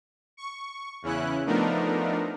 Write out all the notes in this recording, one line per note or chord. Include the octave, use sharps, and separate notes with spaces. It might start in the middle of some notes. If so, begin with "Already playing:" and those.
C#6
E2 C#3 C#4 E4 F#6
F3 A3 B3 D4 D#4 A#4